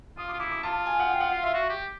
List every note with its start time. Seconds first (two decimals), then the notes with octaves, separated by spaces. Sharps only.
0.17 F4 D#6
0.29 D6
0.33 F4
0.40 E4 D6
0.51 D6
0.63 F4 A5
0.86 G#5
1.00 F#5
1.09 G5
1.20 F#5
1.32 F5
1.43 F4 E5
1.54 F#4
1.69 G4